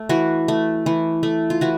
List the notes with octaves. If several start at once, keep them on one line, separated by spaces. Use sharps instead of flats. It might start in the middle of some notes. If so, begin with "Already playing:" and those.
Already playing: A3
E3 F#4
A3
E3
A3
F4
E3 F#4